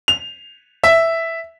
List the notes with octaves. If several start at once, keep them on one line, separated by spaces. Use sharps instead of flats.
F7
E5